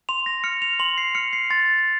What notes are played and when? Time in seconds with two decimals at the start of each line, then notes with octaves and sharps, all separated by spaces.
0.09 C6 F7
0.26 A#6
0.44 F6 C#7
0.62 F7
0.79 C6 F#7
0.98 C7
1.15 F6 C#7
1.33 C7
1.50 C6 A6